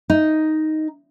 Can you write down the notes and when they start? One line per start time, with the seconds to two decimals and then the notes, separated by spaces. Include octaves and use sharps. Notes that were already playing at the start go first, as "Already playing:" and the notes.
0.10 D#4